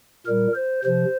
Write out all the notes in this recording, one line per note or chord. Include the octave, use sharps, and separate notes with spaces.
A#2 G3 A#4
C5
C3 F3 C5